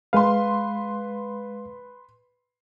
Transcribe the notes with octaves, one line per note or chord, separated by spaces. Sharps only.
G#3 B4 F5 C6